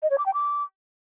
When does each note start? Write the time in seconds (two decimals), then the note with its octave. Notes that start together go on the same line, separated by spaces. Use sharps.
0.03 D#5
0.10 C#5
0.18 D6
0.26 G5
0.34 D6